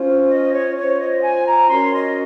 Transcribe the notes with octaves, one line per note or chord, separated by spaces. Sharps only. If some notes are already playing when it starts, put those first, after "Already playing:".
Already playing: C#4 F4 C5
D#5
C#5
F4 C5 C#5
D#5
G#5
A#5
C#4 F#4 A#4 C#5 C6
D#5